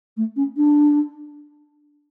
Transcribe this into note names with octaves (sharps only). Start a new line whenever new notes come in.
A3
C#4
D4